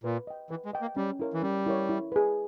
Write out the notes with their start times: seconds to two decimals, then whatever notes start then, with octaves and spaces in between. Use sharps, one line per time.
0.04 A#2 B4
0.27 D#5 G5
0.50 E3 B4
0.66 G#3
0.73 D#5 G5
0.82 A#3
0.97 G3 C#4
1.20 E4 A#4 C#5
1.34 E3
1.43 G3 C#4
1.66 E4 A#4 C#5
1.89 E4
2.12 G#4 B4